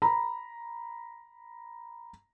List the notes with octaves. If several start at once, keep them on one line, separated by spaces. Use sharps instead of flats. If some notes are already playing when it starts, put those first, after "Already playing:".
A#5 B5